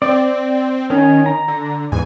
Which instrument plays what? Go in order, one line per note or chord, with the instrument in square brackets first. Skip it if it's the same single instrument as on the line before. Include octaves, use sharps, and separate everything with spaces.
[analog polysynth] C4 [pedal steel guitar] D5
[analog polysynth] D#3 [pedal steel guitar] C#4
[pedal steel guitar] A#5
[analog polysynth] D3
E2 G#2 G#5